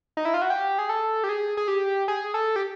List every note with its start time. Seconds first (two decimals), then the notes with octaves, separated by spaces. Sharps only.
0.17 D#4
0.25 E4
0.34 F4
0.42 F#4
0.50 G4
0.79 G#4
0.89 A4
1.24 G4
1.29 G#4
1.57 G#4
1.68 G4
2.08 G#4
2.34 A4
2.56 G4